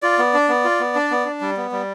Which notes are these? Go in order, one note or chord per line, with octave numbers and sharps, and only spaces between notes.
F4 D5
B3
D4
B3
F4
B3
D4
B3
D4
G3
B3
G3